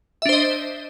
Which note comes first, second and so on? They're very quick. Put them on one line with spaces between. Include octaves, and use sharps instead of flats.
E5 D4 C5 D#5